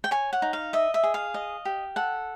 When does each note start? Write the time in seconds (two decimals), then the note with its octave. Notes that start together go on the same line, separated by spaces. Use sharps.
0.04 G5
0.11 C#5 G#5
0.33 F#5
0.42 D#4
0.53 F5
0.73 D#5 E5
0.94 E5
1.03 G#4
1.14 F5
1.34 D#5
1.65 G4
1.96 A4 F#5